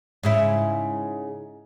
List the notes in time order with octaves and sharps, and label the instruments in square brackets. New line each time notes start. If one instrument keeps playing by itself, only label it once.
[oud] G#2 C#3 E4